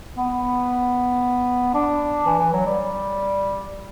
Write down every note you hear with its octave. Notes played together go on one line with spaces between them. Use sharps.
B3
D4
E3
E3
F#3
G3